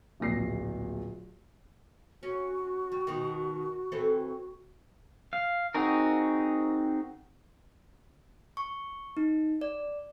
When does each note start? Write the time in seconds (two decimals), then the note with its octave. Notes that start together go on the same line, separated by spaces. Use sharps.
0.20 D1 A#1 A#6 C7
2.23 C#4 F#4
2.92 G3
3.07 B2 D#3
3.92 E3 C4 A4
5.33 F5
5.74 C4 D#4 F#4 G#4 A#4
8.57 C#6
9.17 D#4
9.61 D5